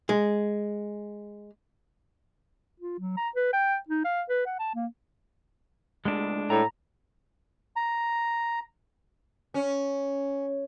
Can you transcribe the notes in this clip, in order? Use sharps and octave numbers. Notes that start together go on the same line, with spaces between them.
G#3
F4
F#3
A#5
B4
G5
D#4
F5
B4
F#5
A5
A#3
C#2 A2 G#3 D4
A2 A#5
A#5
C#4